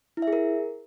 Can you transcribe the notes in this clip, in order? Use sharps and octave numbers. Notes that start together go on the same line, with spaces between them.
E4
E5
G#4
A#4